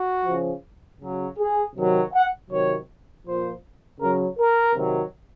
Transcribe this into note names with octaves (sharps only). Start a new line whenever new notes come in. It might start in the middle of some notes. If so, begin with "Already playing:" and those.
Already playing: F#4
C#3 F3
C#3 F#3
G#4
C3 D#3 F#3
F#5
C3 D#3 F#3 C#5
A#2 F3 C5
C#3 F#3 A#4
A#4
C3 D#3 F#3